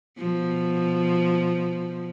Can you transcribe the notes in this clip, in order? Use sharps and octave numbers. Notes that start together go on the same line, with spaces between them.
B2 F3